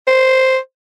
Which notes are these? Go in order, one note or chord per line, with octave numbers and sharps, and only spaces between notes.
C5